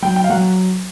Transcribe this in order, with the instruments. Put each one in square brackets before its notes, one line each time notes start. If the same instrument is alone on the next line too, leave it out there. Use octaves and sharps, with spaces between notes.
[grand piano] F#3 [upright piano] G5
[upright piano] G5
F5
[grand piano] F#3 [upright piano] F#5